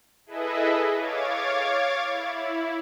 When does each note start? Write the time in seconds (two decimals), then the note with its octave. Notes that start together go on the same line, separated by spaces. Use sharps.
0.26 E4 G#4 A4 B4 D#5 E5
0.95 C#5 F5 D6 G#6 A6
2.07 E4